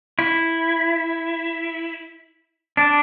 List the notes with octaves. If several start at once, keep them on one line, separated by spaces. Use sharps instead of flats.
E4
D4